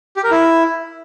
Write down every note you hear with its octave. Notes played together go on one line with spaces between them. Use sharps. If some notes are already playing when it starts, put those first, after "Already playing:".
G4
A#4
E4